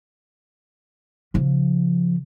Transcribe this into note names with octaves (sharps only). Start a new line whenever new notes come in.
C#3 F3